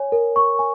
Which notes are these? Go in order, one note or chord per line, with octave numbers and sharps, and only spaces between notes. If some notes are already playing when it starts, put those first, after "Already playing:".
Already playing: C#5 G#5
A#4
C#6
G#5